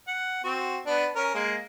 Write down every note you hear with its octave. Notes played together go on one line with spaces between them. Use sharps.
F#5
C4 F#4
B3 D4
C#4 A#4
G#3 A#3